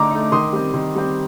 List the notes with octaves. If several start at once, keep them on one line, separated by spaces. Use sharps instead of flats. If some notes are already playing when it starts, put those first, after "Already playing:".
Already playing: D3 A3 D#4 A#5 D6
A3 D#4
D#3 C6 D#6
G3 C4
D#3
G3 C4